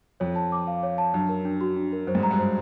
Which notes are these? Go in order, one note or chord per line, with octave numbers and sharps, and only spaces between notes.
F2 C#5
A5
D6
F5
C#5
A5
F#2 D4
A#4
D4
F#4
D4
A#4
F#2 C5
G#2
G2
A#5
G2
C5